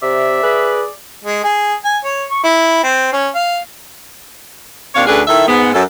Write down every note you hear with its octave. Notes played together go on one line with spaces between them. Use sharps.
C3 D5 E5
G#4 B4
G#3
G#4
G#5
C#5
C#6
E4
C4
C#4
F5
D#2 C4 D4 C#5 F5
D2 C#4 D4 G#4 A4 B4
D#3 E4 A4 E5
G#2 B3
F#2 A4